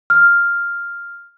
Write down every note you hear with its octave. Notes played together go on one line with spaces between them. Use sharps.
F6